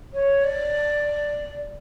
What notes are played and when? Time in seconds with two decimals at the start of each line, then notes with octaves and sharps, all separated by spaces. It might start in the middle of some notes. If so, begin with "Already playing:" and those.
0.13 C#5
0.43 D5